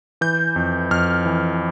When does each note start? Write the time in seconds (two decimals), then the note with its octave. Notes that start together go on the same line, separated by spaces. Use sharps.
0.21 E3 G6
0.56 F2
0.91 F2 F6
1.26 E3